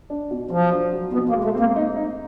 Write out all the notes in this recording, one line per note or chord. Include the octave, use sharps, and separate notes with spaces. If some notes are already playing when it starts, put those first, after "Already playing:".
D4
B2
F3 F#3
D4
F#3
B2 B3
A#3
G#3
A3
A#3 C4
D#4
D#4